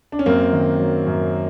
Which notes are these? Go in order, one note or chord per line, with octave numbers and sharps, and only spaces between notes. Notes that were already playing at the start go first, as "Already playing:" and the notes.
D4
C#4
F#2 A#3 C4
D#3
F#3
F#2